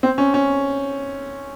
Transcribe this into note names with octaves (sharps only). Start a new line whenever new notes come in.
C4
C#4
C#4